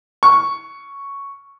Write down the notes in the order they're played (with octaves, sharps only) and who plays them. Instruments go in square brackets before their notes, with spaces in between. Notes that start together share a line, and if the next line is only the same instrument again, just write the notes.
[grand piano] C#6